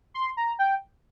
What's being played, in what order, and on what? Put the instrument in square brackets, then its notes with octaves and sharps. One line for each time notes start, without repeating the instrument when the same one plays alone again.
[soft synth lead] C6
A#5
G5